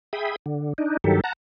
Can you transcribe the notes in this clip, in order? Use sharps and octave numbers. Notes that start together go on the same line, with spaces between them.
G#4 E5 G5 B5 D#6
D3
D4 D#4
G2 D#3 F#3 G4 A4
F#5 A5 A#5